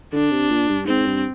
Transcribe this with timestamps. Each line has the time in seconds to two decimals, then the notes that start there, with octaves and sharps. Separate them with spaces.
0.13 D3 D4
0.31 C3
0.50 A#2
0.69 G2
0.87 G#2 C4
1.06 G2